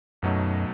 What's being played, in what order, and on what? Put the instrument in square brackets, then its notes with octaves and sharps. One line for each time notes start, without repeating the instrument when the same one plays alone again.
[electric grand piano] B1 B2 F#3 A3 D#4 [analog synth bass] F#2